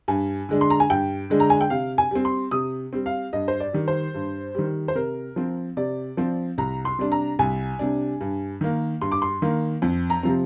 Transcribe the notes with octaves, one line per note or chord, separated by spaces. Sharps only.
G2 G#5
D3 G#3 D4
C6
A#5
G#5
G2 G5
D3 G#3 D4
A#5
G#5
G5
C3 F5
G#5
G3 C4
C6
C3 D#6
G3 C4
F5
G2 D#5
C5
D5
D#3 G3
C5
G2
D#3 G3
C5
C3 A#4
F3 C4
C3 D5
F3 C4
C2 A#5
C6
C3 G3 D4
A#5
C2 G#5
C3 G3 D4
G2
D#3 A#3
G2 C6
D6
C6
D#3 A#3
F2
A#5
C3 F3 C4